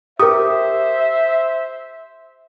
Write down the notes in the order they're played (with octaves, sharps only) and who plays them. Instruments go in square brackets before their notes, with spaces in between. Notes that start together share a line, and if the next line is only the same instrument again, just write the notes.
[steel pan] G4 [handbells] A#4 D#6 [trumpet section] C5 E5